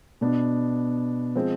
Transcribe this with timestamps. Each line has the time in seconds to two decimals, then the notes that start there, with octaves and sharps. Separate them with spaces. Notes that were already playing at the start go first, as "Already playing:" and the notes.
0.21 B2 B3 D4
1.35 F3 G#3 C4